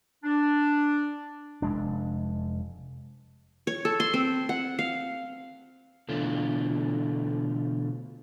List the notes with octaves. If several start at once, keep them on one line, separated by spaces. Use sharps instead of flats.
D4
F1 G#3 D4
C#5
A4
C6
C4
F#5
F5
B2 D3 E3 A3 F4